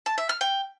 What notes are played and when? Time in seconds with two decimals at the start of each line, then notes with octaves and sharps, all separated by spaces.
0.06 A5
0.18 E5
0.29 F6
0.41 G5